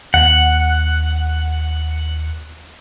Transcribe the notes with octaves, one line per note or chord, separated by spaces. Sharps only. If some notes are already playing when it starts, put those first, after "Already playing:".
D#2 F#5